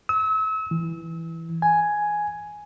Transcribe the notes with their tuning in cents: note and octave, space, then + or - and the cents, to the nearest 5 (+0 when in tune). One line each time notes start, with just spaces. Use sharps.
E6 -35
E3 +0
G#5 +5